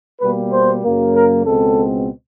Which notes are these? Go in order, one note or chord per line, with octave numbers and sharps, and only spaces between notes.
B2 G3 A#3 B4
C5
F#2 C#3 F#3 A#3
A#4
C#2 B2 G#3 C4 A4